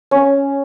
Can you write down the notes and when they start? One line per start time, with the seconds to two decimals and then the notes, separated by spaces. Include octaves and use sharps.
0.11 C#4